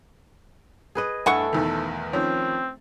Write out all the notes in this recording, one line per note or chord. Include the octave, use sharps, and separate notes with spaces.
G#4 B4 D#5
G2 E3 A3 A4 F#5 C#6
B1 E2 D#3
D#3 F3 C4 C#4